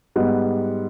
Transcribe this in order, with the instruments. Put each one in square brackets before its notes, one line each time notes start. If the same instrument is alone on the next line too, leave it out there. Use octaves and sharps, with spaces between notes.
[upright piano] G#2 G3 B3